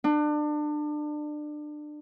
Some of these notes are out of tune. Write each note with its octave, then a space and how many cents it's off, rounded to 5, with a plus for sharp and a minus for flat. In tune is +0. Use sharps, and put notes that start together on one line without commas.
D4 +30